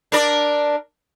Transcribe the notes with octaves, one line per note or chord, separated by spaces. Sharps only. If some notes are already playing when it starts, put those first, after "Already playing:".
D4 A#4 D5